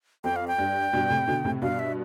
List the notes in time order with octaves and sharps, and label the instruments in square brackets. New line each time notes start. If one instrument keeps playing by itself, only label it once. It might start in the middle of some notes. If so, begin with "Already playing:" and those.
[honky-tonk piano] F2 [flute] G5
[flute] F5
G5
[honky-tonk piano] G2
G2 B2
A2 C3
B2 D3
A2 C3
[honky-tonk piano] G2 B2 [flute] F5
[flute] E5